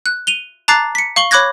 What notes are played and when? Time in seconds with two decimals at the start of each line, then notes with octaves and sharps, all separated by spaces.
0.06 F#6
0.27 D#7 F7 G7
0.68 A5 A#5 D6 F#6 A6 C7
0.95 B6 C#7
1.16 F5 C#6 F#7 G7
1.31 C#5 B5 D6 F#6 G#6 A#6